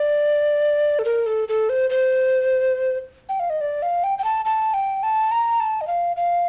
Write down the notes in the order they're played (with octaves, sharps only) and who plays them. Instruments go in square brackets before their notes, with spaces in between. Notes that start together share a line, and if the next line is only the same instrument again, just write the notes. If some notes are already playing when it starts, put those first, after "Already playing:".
Already playing: [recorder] D5
A4
A#4
A4
A4
C5
C5
G5
F5
D#5
D5
F5
G5
G5
A5
A5
G5
A5
A#5
A5
D#5
F5
F5